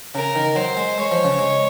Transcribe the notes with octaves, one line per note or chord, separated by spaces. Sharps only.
C#3 A#4
D#3
F#3 C5
G#3
G#3 C#5
F3
C#3
G#3